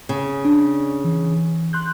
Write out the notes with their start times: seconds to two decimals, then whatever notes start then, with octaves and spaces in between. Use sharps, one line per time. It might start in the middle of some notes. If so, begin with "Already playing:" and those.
0.09 C#3
0.45 D4
1.05 E3
1.73 C6 F#6 G6